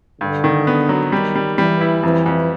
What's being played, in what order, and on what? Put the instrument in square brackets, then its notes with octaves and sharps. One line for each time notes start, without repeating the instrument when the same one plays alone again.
[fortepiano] G2 [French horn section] D3
[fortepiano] D#3
B3
F#3
[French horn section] D#3 [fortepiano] G3
[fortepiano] G3
[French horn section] E3 [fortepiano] G3
[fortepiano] E4
[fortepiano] F2 [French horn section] E3
[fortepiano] F2